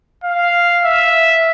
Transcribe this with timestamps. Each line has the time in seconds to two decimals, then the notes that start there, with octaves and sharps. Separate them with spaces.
0.24 F5
0.85 E5